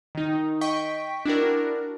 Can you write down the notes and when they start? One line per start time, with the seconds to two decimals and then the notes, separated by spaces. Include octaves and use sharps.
0.15 D#3 D#4
0.61 D#5 G5 C#6 B6
1.25 D4 E4 F#4 A#4